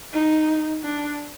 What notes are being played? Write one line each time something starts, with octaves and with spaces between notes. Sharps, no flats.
D#4
D4